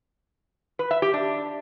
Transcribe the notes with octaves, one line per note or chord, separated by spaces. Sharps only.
B4
E5
G4
D4